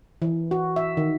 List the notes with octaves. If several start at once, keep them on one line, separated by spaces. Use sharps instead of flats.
E3
F#4
E5
D#3